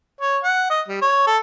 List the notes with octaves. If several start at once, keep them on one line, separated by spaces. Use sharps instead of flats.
C#5
F#5
D#5
G3
C#5
A4